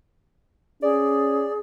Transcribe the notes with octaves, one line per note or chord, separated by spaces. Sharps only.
C#4 G#4 D5